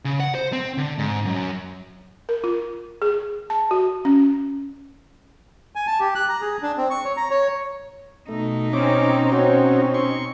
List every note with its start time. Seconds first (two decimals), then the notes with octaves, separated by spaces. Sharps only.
0.05 C#3
0.20 F#5
0.35 C5
0.53 C4
0.78 D3
0.98 G#2
1.25 F#2
2.29 A#4
2.44 F4
3.02 G#4
3.50 A5
3.71 F#4
4.05 C#4
5.75 G#5
5.87 A5
6.00 G4
6.15 F#6
6.29 A#5
6.41 G#4
6.62 D4
6.78 C4
6.90 C#6
7.05 C#5
7.17 A#5
7.31 C#5
8.28 B2 A3 D#4
8.73 C4 C#4 C#5 D6
9.32 F#4 C5 C#5
9.94 C6 C#6